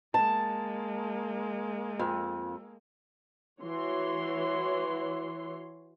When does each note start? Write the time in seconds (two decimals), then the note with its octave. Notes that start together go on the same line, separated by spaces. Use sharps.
0.14 G#3 A#3 A5
1.99 F2
3.62 E3 F#4 C#5 C6